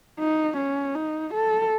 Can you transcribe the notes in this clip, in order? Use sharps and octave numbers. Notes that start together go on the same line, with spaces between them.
D#4
C#4
D#4
A4